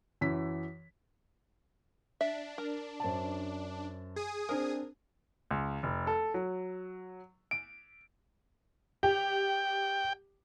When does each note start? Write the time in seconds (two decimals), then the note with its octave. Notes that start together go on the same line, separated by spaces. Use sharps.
0.21 F#2 E3 B6
2.21 D4 E5
2.58 A#4
3.00 F#2 C5 A5
4.16 G#4 D#6
4.49 C4 D4 A#4 C5
5.51 C#2
5.83 F1
6.07 A4
6.34 F#3
7.51 D7
9.03 G4 G5